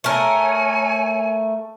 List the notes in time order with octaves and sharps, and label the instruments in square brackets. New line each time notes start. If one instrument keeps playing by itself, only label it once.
[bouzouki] A3 A#4 [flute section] C#5 G#5